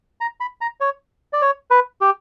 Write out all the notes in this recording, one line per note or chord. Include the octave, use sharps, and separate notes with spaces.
A#5
B5
A#5
C#5
D5
C#5
B4
G4